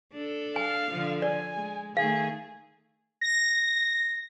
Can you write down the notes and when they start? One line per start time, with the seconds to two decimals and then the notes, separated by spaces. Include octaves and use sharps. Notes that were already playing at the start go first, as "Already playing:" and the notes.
0.12 D4 A4
0.56 F5 G#5
0.91 D3 F3
1.22 D5 G#5
1.55 G#3
1.97 D#3 A3 G#4 F5
3.21 A#6